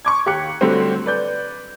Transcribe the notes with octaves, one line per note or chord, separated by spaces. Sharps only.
C#6 D6 G#6
D#2 G4 D6 F#6 C#7
D3 F#3 G3 A3 C4
B4 D5 G6